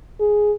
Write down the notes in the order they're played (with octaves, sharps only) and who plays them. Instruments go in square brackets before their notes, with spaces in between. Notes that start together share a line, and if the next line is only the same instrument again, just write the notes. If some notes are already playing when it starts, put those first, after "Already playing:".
[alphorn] G#4